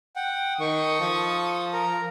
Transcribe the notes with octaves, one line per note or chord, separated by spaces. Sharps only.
F#5 G5
D#3 A4 C#6 D#6
F3
A#4 A#5